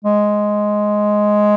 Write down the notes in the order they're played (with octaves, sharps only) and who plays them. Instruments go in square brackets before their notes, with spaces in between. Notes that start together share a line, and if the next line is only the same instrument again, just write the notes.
[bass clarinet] G#3